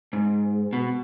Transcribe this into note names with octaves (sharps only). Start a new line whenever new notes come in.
G#2
B2